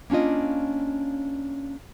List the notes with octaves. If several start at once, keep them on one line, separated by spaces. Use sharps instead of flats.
A#3 C#4 D4 F4 D#5